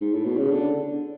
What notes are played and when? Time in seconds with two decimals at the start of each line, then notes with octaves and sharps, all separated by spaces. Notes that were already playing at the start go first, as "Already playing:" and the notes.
0.01 G#2
0.13 A2
0.25 B2
0.38 C#3
0.50 D3